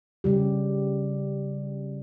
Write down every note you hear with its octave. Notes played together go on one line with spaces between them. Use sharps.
C#3 G3 G4